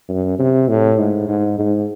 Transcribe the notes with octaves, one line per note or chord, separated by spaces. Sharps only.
F#2
C3
A2
G#2
G#2
G#2